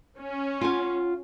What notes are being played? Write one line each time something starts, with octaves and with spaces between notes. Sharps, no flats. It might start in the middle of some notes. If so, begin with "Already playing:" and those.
C#4
F4 F#5 G#5